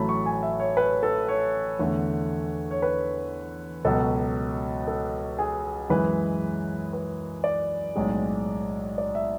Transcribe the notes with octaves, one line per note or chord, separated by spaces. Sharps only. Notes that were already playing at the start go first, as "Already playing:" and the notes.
Already playing: A1 A2 F#3 A3 A5 B5
C#6
G#5
E5
C#5
B4
A4
C#5
E2 D3 A3
C#5
B4
C#2 B2 F#3 A4
A4
G#4
F#2 E3 G#3 B4
B4
D5
B1 A2 G#3
D5
E5